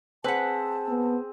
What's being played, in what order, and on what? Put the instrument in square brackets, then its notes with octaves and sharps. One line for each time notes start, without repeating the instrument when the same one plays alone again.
[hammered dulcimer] C4 G#4 [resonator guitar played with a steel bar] B4 F#5 [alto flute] A5
[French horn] B3